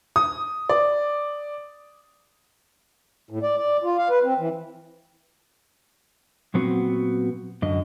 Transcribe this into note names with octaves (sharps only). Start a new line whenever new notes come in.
D#6
D5
A2
D5
D5
F4
F5
B4
C4
E3
A#2 F#3 B3 C4 F#4
F#2 D3 D#5